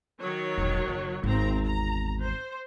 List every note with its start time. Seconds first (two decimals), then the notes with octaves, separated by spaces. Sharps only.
0.19 D#3 F#3 C#5
0.58 E1 A#1
0.88 F#1
1.24 G#1 E2 C4 A#5
1.64 A#5
2.23 C5